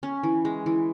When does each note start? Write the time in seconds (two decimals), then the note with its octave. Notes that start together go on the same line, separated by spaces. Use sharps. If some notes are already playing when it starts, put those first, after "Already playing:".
0.03 C#4
0.23 E3
0.45 G#3
0.66 E3